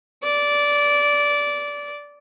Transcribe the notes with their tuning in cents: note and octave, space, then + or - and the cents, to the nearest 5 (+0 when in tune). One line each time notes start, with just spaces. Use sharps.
D5 -15